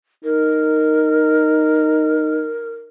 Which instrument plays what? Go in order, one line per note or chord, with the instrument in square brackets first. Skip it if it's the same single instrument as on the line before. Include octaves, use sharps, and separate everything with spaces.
[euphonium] D#4 [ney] A#4